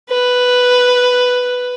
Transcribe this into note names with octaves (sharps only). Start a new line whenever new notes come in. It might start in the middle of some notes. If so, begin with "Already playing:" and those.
B4